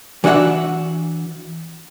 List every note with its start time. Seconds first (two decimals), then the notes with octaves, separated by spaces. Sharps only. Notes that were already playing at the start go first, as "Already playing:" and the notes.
0.24 E3 D4 F#4 E5 F#5